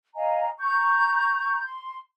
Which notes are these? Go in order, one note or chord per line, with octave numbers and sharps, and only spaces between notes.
D#5 F5 G#5 A#5
A#5 C#6 G6
C6